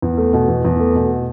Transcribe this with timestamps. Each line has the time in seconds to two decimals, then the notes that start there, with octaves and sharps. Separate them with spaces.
0.02 E2
0.18 A3
0.33 B2
0.48 E2
0.65 E2
0.80 A3
0.95 B2